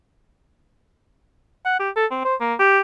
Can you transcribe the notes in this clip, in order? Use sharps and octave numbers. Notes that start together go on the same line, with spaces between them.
F#5
G4
A4
C4
C5
A#3
G4